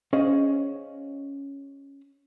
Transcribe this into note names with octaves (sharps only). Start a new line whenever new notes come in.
C#4 G#4 C5 D#5 F5